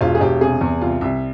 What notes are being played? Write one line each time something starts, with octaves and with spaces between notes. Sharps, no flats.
E1 F4
G#4
E1 G4
C3 G#4
E2
C2 F4
C2 E5